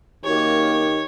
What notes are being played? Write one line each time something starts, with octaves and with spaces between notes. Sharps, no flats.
F#2 D#3 A#3 G4 C#5